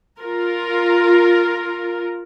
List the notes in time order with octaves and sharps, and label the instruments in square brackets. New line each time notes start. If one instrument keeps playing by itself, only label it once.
[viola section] F4 A#4